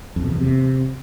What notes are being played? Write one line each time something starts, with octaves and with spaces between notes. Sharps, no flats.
F2
B2
E2
C3